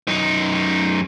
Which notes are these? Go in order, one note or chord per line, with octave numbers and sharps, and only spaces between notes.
F#2 D#4